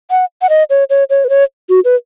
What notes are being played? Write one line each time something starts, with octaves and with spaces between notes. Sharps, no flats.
F#5
F#5
D#5
C#5
C#5
C#5
B4
C#5
F#4
B4